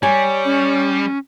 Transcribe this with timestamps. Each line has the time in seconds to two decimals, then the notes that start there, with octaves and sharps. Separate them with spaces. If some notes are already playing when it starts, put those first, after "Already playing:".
0.03 G3 C#5 G#5
0.45 C#4